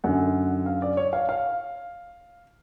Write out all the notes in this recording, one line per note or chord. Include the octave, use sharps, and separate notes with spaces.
F#2 D3 F#5
F5
D5
C#5
F5
F5